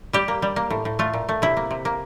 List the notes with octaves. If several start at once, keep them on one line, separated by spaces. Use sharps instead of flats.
G3 G4
A#3
G3
A#3
A2
A2
A3 F4
A#2
A3
C3 E4
A#3
C3
A#3